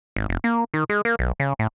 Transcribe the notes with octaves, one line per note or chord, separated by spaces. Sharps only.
G#1
F1
A#3
D#3
G#3
A#3
B1
C#3
A2